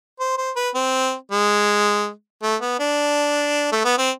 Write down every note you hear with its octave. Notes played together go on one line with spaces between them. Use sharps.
C5
C5
B4
C4
G#3
A3
B3
D4
A3
B3
C4